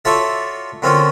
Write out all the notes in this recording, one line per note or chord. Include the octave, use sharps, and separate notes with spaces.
F4 F#4 A4 C#5 D5 E5
D3 A#3 C4 C#4 F4 F#4